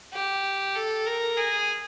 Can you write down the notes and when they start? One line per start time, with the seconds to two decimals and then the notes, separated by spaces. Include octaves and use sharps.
0.13 G4
0.75 A4
1.06 A#4
1.37 G#4